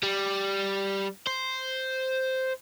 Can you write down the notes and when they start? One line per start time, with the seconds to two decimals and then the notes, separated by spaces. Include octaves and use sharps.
0.03 G3
1.27 C5